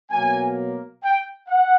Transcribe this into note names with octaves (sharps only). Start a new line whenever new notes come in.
B2 F#3 A#3 G#5
G5
F#5